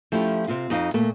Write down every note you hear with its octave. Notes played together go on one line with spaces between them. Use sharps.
F3 A3 C#4 E4 G4
C3 C4 F4 F5
F2 D#4 F4 F5
A#2 A3 A#3